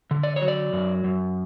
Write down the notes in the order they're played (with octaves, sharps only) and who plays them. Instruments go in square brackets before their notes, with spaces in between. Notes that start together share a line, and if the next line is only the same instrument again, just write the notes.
[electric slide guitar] D3
D5
C#5
F#3
D5
F#2
F#2